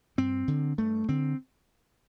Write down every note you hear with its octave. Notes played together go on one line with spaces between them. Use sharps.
G2 C4
D3
G2 A3
D3 C4